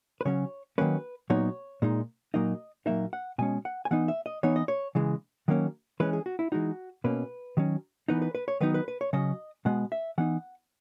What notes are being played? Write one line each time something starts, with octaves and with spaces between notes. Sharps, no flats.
B4
C#3 F#3 C#4 C#5
D#3 F#3 A#3 C#4 B4
A#2 F#3 B3 D#4 C#5
A#2 G#3 D#4
A#2 F#3 A#3 D#4 D#5
A#2 F#3 A#3 D#4 E5
F#5
B2 G#3 C#4 G#5
F#5
G#5
E3 B3 D#4 F#5
E5
D#5
E3 B3 D#4 C#5
D#5
C#5
C#3 E3 G#3
D#3 F#3 A#3 C#4
E3 G#3 C#4 B4
G#4
F#4
E4
E3 G#3 D#4 F#4
B2 A#3 C#4 B4
D#3 F#3 C#4
E3 B3 D#4 B4
B4
B4
C#5
D#3 F#3 B3 D#4 B4
B4
B4
C#5
C#3 F#3 C#4 D#5
B2 G#3 B3 F#5
E5
E3 B3 D#4 F#5